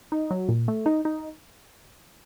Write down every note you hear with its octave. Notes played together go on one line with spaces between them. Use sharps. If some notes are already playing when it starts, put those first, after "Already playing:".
D#4
F#3
A#2
A3
D#4
D#4